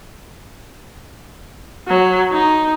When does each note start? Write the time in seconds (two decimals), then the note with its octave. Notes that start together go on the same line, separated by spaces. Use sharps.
1.88 F#3
2.32 D#4